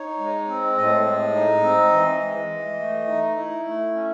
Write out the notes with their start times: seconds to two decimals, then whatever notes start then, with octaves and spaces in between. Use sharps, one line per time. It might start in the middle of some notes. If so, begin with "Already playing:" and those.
Already playing: D#4 C#5
0.19 G#3
0.48 C4
0.77 A2 D#5
1.06 G#3
1.35 D#4
1.63 C4
1.92 E3
2.21 G#3
2.51 E3
2.79 A3
3.08 D#4
3.37 E4
3.66 A3
3.95 C#4